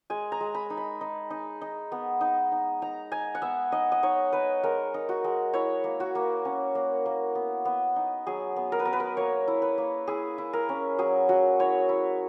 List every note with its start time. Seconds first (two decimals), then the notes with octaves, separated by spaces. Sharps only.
0.10 G#3 G#5
0.32 A#5
0.40 G#3
0.55 B5
0.70 D#4
0.77 B5
1.01 D#4
1.30 D#4
1.61 D#4
1.92 B3
2.21 D#4
2.52 D#4
2.82 D#4 A#5
3.12 D#4 G#5
3.35 F#5
3.42 B3 E5
3.72 D#4 D#5
3.92 D#5
4.03 D#4 C#5
4.33 D#4 B4
4.63 G#3 A#4
4.94 D#4
5.09 F#4
5.24 G#3
5.54 E4 C#5
5.84 A#3
6.00 F#4
6.15 A#3
6.45 C#4
6.75 A#3
7.06 A#3
7.35 B3
7.65 B3
7.96 D#4
8.27 F#3 G#4
8.57 B3
8.72 A#4
8.80 B4
8.85 B3 A#4
8.93 B4
9.00 A#4
9.17 A#3 C#5
9.48 E4
9.62 B4
9.78 A#3
10.08 E4 G#4
10.38 E4
10.53 A#4
10.69 C#4
10.99 F#3 G#4
11.29 F#3 F#4
11.59 E4 C#5
11.89 E4